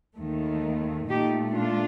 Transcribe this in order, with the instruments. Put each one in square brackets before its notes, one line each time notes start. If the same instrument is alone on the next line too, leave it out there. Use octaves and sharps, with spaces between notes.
[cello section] D#2 D#3 A3
A#2 A3 D#4 G4
D4 F4